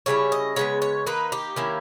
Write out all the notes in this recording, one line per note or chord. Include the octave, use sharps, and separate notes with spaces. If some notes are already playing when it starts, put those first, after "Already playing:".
C#3 G3 C#4 E4 C#5
D#5
C#3 G#3 B3 C#5
C#5
D#3 A#3 D#4 B4
G4
D#3 A#3 C#4 E4